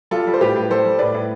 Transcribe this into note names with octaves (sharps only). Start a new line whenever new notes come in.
G3 F4 A4
G3
C5
A2 G4 B4
A2
G3 A4 C5
G3
A2 B4 D5
A2